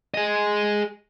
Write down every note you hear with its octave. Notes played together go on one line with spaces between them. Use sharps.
G#4 D#5